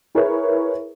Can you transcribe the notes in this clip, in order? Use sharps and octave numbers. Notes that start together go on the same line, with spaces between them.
E4 G#4 A#4 B4 C#5 E5